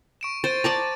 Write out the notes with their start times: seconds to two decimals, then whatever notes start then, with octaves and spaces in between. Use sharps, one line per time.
0.21 C#6 D7 E7
0.44 C5 A6 D7 D#7
0.64 D5 A5 A#5